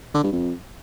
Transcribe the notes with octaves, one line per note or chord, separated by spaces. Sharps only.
D3
G2
F2